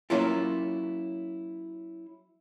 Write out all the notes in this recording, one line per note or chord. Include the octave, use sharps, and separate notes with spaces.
F#3 A#3 C#4 E4 F4